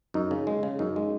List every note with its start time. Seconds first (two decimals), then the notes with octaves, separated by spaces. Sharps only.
0.14 F#2 D#4
0.31 C#3
0.47 G#3
0.63 C#3
0.79 F#2 D#4
0.96 G#3